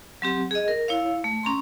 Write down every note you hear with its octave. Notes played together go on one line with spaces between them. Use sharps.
F#3 C4 G4
G#4 D#5
A#4
E4 C#5 F5
A3
C#4 A#5 C6